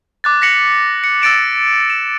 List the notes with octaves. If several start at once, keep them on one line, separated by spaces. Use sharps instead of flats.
D6 F#6 A6
A#6 B6 C#7 F#7
C#7
E6 A6 D7 E7
E7